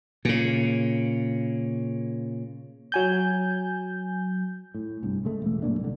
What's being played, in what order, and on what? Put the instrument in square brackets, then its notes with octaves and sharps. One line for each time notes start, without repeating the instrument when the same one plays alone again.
[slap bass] A#2 C#3
[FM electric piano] F#3 G#5 G6
[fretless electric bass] A2
C2 G2
C#3 G#3 A3
E1 A1 A3
F#2 A#2 A#3 D4
C2 D3